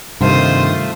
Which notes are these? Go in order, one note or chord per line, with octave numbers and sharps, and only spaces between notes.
G2 C3 D#3 A3 F4 C5 D#6